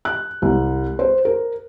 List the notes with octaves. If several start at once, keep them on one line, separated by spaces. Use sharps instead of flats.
F#6
C2
C5
A#4